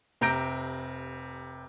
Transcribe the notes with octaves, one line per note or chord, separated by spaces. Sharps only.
F1 C3 A#5 G6 A#6 D7